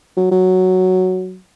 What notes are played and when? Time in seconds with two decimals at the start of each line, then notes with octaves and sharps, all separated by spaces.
0.17 F#3
0.31 F#3